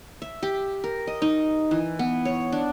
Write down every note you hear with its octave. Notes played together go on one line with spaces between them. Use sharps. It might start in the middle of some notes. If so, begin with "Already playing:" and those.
E5
G4
A#4
D#5
D#4
E3
B3
C#5
D4